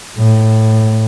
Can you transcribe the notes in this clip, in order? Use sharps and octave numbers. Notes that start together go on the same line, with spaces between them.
A2